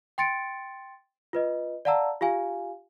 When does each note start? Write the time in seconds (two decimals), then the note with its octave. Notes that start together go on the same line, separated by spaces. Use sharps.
0.18 G5 C6 A6 C#7 D7
1.33 F4 B4 D#5
1.85 D5 F5 F#5 A5 A#5 E6
2.21 F4 G4 F5 G#5